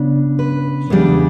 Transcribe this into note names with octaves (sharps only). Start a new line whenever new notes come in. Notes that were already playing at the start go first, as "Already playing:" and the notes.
Already playing: C#3 B3 D4
B4
E2 C#3 G3 D4